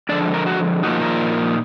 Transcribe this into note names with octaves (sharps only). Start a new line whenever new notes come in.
D3 F3 G#3 D4 D5
A#4
F#4
A#2 F3 A#3 D#4 F#4
A#4